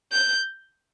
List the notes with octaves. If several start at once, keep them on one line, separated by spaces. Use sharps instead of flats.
G6